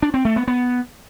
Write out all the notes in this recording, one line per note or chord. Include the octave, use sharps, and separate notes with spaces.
D4
C4
A3
B3
B3